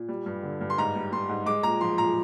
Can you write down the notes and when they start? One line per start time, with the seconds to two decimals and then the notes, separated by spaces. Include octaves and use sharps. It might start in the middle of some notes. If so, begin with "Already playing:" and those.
Already playing: A#2
0.09 G3
0.26 G2
0.43 D3
0.61 G2
0.70 C6
0.78 G#2 A#5
0.95 G3
1.12 G3 C6
1.29 G#2
1.46 G#3 D6
1.63 A#2 A#5
1.81 F3 C6
1.98 A#2 A#5